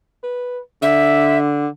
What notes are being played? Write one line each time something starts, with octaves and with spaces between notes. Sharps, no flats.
B4
D3 E5